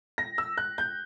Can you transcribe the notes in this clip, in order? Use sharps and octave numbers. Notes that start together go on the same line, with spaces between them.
A#6
E6
F#6
G6